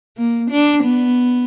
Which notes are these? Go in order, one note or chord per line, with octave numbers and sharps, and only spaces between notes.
A#3
D4
B3